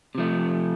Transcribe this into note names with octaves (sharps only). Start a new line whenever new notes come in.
C3 F3 A3